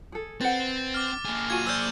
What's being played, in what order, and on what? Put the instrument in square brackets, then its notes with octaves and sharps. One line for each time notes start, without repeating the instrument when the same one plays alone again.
[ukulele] G#4 A4
[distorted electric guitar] C4 [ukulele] B4 F#5 [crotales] A6
[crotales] D6 F6
[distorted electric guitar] A#3 G#4
[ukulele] F4 F#4 G#5 [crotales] G#6 D#7
[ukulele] C5 D5 [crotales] E6 F6 G6